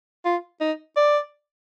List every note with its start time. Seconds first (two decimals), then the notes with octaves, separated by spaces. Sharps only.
0.25 F4
0.61 D#4
0.96 D5